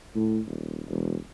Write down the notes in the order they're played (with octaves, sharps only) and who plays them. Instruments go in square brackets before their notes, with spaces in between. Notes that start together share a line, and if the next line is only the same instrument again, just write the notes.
[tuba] A2
D#1
E1